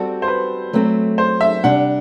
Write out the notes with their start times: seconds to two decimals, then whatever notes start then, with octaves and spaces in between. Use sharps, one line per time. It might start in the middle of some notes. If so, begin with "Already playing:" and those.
Already playing: G3 C4 F#4 A4
0.22 C5
0.28 B4
0.73 F#3 A3 C4
1.18 C5
1.41 E5
1.64 C3 G3 D4 G4 F#5